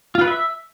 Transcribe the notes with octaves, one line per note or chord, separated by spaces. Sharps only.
F4
B4
E5